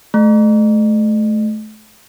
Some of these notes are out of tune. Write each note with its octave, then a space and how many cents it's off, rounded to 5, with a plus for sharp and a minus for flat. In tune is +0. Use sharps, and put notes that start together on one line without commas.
A3 -30